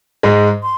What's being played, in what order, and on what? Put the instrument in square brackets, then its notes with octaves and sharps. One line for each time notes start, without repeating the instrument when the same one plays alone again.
[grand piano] G#2 G#3
[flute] C6